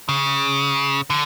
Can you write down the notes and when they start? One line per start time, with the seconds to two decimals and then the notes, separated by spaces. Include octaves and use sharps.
0.09 C#3
1.10 D3